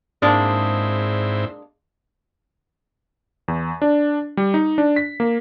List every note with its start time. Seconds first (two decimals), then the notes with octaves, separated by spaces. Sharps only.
0.22 G#2 G#3 A#3 C4 D4 E4
3.48 E2
3.82 D4
4.37 G3
4.54 D#4
4.78 D4
4.96 B6
5.20 A#3